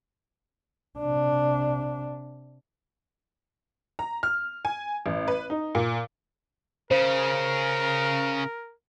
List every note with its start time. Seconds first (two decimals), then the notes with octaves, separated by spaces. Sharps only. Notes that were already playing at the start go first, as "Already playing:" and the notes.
0.99 C3 D4
3.99 A#5
4.23 F6
4.65 G#5
5.06 A1
5.28 B4
5.50 D#4
5.75 A#2
6.91 C#3 A#4 C5